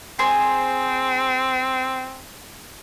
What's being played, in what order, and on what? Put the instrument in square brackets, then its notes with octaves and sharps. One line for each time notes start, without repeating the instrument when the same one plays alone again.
[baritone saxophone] C4 [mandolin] G#4 C5